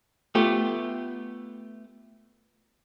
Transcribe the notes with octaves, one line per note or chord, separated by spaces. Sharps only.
A3 B3 F4 G4